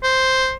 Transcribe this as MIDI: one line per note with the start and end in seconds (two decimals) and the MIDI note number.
0.03 0.54 72